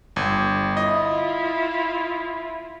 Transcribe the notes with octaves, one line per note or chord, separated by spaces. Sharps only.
G1
E4 F4 D#5